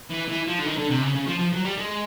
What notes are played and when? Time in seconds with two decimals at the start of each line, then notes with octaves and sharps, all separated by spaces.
0.10 E3
0.28 E3
0.47 F3
0.59 D3
0.66 D#3
0.78 D3
0.90 C3
1.02 C#3
1.15 C#3
1.27 F3
1.39 F3
1.52 F#3
1.64 G3
1.77 G#3